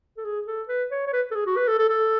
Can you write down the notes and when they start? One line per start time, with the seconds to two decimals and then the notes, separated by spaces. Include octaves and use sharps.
0.17 A4
0.25 G#4
0.47 A4
0.68 B4
0.91 C#5
1.07 C#5
1.13 B4
1.31 A4
1.35 G#4
1.46 F#4
1.57 B4
1.68 A4
1.79 A4
1.89 A4